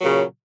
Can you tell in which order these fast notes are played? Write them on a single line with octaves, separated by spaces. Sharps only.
F#3 A#2 C#3